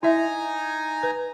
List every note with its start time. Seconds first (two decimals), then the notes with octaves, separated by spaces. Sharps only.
0.03 D#4 E4 E5 G#5 A#5
1.03 B4